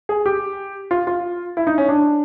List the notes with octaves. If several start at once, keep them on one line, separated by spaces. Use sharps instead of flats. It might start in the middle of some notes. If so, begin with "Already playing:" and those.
G#4
G4
F4
F4
E4
D#4
C#4
D4